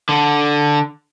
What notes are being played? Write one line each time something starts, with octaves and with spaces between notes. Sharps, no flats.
D3